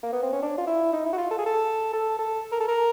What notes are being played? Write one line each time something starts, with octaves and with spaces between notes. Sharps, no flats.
A#3
B3
C4
C#4
D4
F4
E4
D#4
E4
F#4
F4
A4
G#4
A4
A4
A4
A#4
A4
A#4